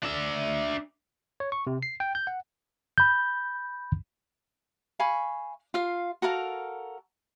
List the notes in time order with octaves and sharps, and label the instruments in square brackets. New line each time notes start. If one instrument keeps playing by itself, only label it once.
[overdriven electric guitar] D4 E5
[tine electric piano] C#5
C#6
C3
C7
G5
G6
F#5
B5 G6
[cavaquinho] F5 G#5 B5 C#6
F4 F5
F#4 A4 A#4 F5